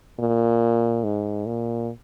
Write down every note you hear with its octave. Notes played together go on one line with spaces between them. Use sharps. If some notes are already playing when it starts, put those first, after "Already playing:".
A#2
G#2
A#2